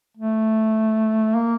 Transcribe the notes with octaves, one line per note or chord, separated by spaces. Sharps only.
A3
A#3